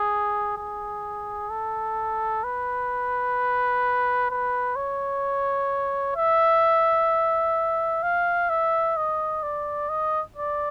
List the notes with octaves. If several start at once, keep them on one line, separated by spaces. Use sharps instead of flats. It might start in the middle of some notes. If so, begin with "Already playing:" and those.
Already playing: G#4
G#4
A4
B4
B4
C#5
E5
F5
E5
D#5
D5
D#5
D5